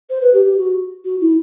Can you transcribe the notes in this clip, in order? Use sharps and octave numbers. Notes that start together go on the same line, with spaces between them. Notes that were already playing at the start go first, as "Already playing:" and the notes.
C5
B4
G4
G4
F#4
F#4
E4